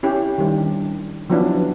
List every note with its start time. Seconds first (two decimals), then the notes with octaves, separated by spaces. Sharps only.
0.03 C#4 E4 G4
0.38 D#3 G3
0.56 D4
1.30 F3 F#3 B3 C#4 D4 E4